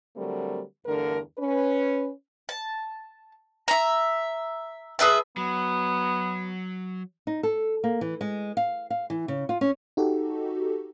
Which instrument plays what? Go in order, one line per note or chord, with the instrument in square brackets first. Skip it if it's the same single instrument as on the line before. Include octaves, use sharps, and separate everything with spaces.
[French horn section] D3 F#3 G3 A3 C4 A#4
E2 G2 D3 A3 A#4
C#4 B4
[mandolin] A5
E5 A#5
G#4 B4 E5 A5
[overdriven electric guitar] F#3 [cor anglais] B3
[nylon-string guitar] D#4
A4
A#3
E3
G#3
F5
F5
E3
C#3
F4
C#4
[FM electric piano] D#4 F#4 G4 A4